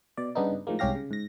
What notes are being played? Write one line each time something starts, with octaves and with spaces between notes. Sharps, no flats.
B2 D5
G2 C#3 B3 D4 D#4
A2 D#3 F3 G#3 A#3
C2 G#2 C#4 G4 F5 A#6
C#3
G#2 A#6